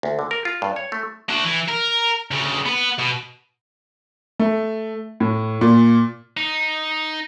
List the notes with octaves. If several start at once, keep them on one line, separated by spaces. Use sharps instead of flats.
D2
D3
A#4
F4
G2
C#5
A3
D4 F#4
E3
A#4
D2 C#3
B3 B4
B2
A3
A2
A#2
D#4